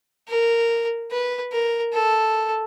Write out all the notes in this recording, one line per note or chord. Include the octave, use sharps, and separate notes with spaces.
A#4
B4
A#4
A4